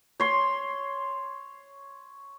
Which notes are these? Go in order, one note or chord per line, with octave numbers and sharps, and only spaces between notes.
C#5 C6